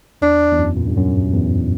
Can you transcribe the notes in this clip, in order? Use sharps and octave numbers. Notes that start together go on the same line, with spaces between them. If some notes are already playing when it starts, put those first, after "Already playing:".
E2 D4
E2
F#2
A#2
G2
F#2
E2